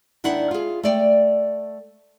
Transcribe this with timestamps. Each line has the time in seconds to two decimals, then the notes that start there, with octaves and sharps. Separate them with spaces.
0.24 D#2 D#3 D4 E4 F#5
0.51 F4 G#4
0.83 A3 D5 G5